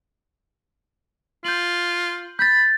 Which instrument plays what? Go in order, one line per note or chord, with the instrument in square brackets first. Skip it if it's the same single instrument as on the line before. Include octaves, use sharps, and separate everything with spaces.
[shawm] F4 [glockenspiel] G6 F#7
[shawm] B5 [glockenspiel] G6 A6